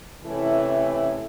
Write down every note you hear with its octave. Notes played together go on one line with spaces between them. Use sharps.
C3 E3 A3 C#4 E4